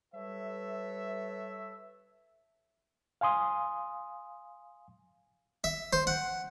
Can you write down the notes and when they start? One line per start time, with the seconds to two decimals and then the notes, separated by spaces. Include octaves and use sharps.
0.15 G3 A4 B4 C#5 E5
3.21 F5 G#5 C6 D#6
5.64 E5
5.93 C5
6.07 F#5